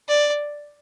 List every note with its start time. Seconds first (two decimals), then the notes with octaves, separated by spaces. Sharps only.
0.08 D5